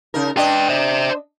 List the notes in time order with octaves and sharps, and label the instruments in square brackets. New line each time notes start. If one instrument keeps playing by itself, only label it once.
[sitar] C#3 D#4 A#4
[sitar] D4 D5 D#5 [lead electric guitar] B4 G5
[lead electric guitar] C5 E5